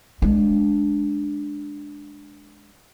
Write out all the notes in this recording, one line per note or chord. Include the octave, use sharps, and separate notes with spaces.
G#3 D4